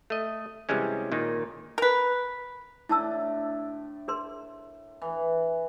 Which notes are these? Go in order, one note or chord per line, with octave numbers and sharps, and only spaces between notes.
A3 D#5
C3 E3 G3 G#3 C#4
A#2 D#3 D#4
A#4 B4
A2 D4 E4 A5 E6
G#4 A#4 C6
E3